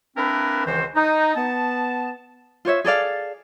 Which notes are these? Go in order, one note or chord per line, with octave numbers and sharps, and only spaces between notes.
A#3 C4 D4 E4 A#4 B4
C#2 D#3 E3 F#4 C5
D#4
B3 A5
F4 C5 C#5 E5
G#4 A4 D5 F5